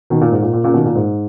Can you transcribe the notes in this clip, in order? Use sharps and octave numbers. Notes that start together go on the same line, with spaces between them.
B2 D#3
A#2
G#2
A#2
A#2
A#2 C#3
B2 D#3
A#2
G#2